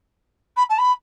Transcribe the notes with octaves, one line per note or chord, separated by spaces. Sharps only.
B5
A5
B5